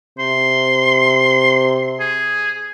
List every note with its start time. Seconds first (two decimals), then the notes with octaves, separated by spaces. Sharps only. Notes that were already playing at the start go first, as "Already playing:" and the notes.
0.19 C3 C6
2.00 G#4